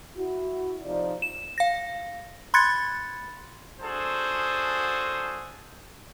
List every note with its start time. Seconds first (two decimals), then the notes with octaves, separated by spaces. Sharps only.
0.16 E4 F#4
0.83 C3 F3 D#4 D5
1.22 E7
1.58 F5 A#6
2.54 B5 C6 F#6 G#6 A6 C#7
3.81 D4 F#4 G#4 A4 C5